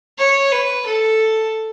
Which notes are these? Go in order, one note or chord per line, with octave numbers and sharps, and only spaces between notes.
C#5
B4
A4